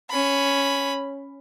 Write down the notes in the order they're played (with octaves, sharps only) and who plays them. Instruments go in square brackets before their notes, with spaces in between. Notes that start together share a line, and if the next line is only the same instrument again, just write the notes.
[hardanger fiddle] C#4 B5